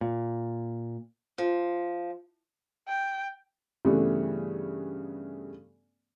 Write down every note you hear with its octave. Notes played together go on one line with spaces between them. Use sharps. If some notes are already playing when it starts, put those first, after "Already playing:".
A#2
F3
G5
G2 C#3 E3 G3 A3 B3